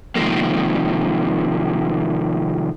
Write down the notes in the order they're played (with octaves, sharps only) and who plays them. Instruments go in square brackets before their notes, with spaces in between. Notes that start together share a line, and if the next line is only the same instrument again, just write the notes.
[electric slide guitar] C3 D#3 F3 G#3 A#3